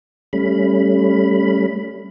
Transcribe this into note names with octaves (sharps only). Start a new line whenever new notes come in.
G3 A3 C#4 B5